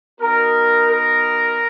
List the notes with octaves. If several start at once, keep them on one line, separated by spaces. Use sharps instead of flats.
B3 D#4 F#4 A#4
A#4